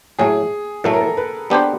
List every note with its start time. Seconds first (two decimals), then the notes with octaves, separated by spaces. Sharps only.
0.19 A2 F#3 A3 G#4
0.84 A2 F#3 A3 A4
0.93 A#4
1.01 A4
1.17 B4
1.50 G3 B3 D4 G4 C5